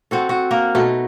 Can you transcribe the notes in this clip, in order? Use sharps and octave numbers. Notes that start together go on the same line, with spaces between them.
C4 F#4 A4
F#4
A#3 A#4
B2 A3 D#4